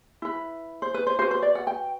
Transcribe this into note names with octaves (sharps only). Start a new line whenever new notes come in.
E4 B4
C5
B4
C5
F#4 B4 C5
C5
D5
F#5
G5